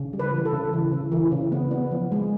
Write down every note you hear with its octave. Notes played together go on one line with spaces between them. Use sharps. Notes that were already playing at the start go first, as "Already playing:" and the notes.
Already playing: C#3
G3
B4
E3
A4
C#3
E3
C#3
E3
C#3
B3
B3
F3
G#3